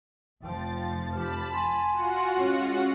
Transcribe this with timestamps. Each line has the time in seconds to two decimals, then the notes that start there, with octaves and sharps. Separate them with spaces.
0.41 F1 F3 G5 A6
1.13 G4 A5 B5 F6
1.53 G#5 C6
1.92 F4 F#4 F#5
2.38 G#3 C#4